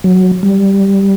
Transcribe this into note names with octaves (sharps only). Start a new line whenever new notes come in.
F#3
G3